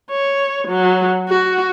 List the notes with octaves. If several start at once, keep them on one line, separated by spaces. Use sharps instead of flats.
C#5
F#3
F#4